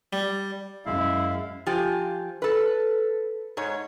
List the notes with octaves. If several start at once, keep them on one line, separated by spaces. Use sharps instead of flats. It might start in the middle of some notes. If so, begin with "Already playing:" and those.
G3
F#2 G#3 E4 F5
F3 F4 G4 G#5
A4 B4
G#2 G#3 C#5